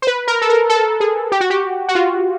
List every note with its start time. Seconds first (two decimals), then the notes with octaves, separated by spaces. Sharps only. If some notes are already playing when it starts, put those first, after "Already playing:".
0.02 C5
0.07 B4
0.28 A#4
0.42 A4
0.49 A#4
0.69 A4
1.00 G#4
1.32 G4
1.41 F#4
1.50 G4
1.88 F#4
1.95 F4